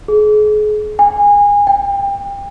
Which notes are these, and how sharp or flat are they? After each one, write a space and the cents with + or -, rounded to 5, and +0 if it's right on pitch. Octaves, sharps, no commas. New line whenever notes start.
G#4 +35
G#5 -25
G5 +30